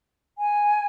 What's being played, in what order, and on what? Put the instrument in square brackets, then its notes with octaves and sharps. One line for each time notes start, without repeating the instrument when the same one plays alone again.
[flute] G#5